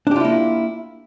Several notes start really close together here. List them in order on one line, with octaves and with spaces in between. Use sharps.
D4 G4 F4 E4 A#3